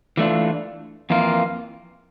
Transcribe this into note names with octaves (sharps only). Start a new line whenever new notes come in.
E3 A3 D4 F4
F2 E3 A#3 F4